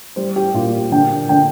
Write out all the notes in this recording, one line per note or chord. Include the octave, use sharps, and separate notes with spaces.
G3 C5
G4
A#2 F4
G4
D3 G5
D3 G5